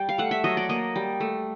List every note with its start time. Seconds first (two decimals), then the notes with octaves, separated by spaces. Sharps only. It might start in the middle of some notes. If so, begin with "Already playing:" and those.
Already playing: G3 G5
0.09 F5
0.18 A3 F#5
0.31 E5
0.44 F#3 D#5
0.57 D5
0.69 A#3 D#5
0.96 G3
1.20 A3